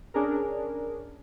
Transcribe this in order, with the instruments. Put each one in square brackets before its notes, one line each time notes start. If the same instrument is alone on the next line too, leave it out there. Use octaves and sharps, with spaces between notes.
[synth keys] C#4 D4 G#4 A#4